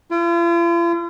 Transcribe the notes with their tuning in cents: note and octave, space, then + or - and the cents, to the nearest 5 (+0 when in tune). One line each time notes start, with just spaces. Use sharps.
F4 -45